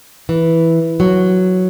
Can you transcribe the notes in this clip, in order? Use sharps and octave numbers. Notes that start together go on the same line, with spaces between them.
E3
F#3